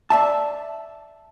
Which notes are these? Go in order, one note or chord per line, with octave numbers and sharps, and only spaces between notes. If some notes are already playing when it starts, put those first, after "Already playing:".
D5 E5 A5